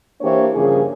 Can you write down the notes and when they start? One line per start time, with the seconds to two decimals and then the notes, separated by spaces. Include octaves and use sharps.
0.21 E3 A#3 D4 G4 C5 C#5
0.54 G2 C#3 F3 A#3 G#4